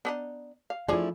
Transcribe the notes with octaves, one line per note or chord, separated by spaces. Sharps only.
B3 D4 D#4
F5
F3 A3 D4 E4 G#4 C#5